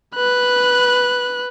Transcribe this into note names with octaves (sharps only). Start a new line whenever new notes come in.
B4 F#6